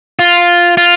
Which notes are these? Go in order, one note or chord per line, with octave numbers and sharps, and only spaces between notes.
F4
F4